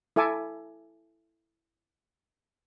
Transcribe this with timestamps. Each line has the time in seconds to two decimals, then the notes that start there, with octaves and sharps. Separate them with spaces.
0.16 E4 A4 E5 G#5 D6